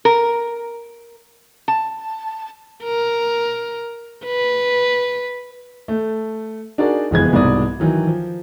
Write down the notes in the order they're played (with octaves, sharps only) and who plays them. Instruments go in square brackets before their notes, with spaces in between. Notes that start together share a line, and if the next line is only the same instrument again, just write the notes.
[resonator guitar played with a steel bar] A#4
A5
[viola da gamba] A#4
B4
[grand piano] A3
D4 D#4 F#4 G#4 A#4 D5
F#1 F2 E3 G#3 B3 G#6
C2 G#2 B2 D5 D#6
D#3 E3 F#3
F3